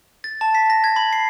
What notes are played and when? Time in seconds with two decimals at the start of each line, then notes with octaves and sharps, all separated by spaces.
0.24 A6
0.41 A5
0.55 B6
0.70 A#6
0.84 G#6
0.96 B5
1.13 C7